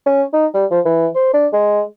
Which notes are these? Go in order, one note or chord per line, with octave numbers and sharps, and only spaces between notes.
C#4
D#4
G3
F3
E3
C5
D4
G#3